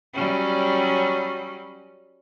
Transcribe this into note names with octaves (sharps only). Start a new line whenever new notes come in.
F#3 G3 C#4